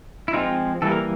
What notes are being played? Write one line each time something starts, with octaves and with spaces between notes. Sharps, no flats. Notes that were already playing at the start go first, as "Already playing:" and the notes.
E4
F3 G#3 C4 D#4 F4
E3 G3 A#3 A4
A#4